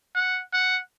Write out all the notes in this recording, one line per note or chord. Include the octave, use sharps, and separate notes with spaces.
F#5
F#5